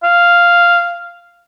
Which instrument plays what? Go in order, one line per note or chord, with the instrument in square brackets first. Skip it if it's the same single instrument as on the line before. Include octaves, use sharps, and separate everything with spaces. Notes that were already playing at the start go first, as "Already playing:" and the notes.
[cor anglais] F5